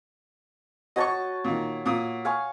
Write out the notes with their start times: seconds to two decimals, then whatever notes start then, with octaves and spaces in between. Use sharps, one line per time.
0.96 F#4 C#5 D#5 A5 C#6
1.44 A#2 D#3
1.86 A#2 D#6
2.25 F5 G#5 C#6